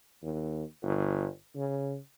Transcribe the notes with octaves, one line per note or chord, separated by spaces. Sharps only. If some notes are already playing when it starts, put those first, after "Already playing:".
D#2
G1
C#3